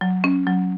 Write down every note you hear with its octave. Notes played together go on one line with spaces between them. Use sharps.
F#3
C#4
F#3